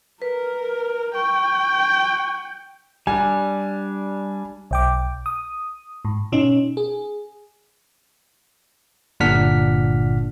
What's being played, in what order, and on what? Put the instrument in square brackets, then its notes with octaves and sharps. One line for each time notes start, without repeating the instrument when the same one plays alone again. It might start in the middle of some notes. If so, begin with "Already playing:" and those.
[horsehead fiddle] A#4 [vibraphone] B4
[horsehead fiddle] G5 [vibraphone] C#6
[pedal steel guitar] G3 D4 [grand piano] G#5
[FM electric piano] B1 G5 D6
D#6
G#2
B2 C#4 D#4
G#4
[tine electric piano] G1 A#2 D4 F#5 F6 B6